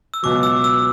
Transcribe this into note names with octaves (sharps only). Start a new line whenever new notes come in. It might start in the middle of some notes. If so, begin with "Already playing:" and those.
E6
C#2 B2 F#3 D6
E6
E6